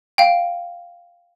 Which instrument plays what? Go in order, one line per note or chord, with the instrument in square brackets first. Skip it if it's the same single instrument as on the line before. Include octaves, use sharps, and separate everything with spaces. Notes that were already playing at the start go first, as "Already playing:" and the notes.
[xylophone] F5 G5